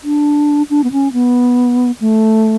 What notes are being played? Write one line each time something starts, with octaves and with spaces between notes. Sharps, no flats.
D4
D4
B3
C#4
B3
A3